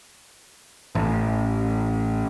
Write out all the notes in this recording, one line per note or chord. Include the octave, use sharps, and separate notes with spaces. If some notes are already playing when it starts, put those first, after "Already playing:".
A1